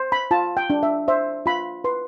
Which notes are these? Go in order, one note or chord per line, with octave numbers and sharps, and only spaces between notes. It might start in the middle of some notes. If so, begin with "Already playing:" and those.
Already playing: C5
B5
F4 A5
G5
D4
E5
C5 E5
F4 B5
B4 C6